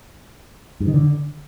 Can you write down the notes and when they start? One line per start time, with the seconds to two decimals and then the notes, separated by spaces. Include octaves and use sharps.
0.80 G2
0.87 D#3
0.94 D3